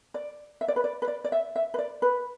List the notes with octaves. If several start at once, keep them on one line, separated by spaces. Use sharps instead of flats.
D5
E5
D5
B4
D5
B4
D5
D5
E5
E5
B4
D5
B4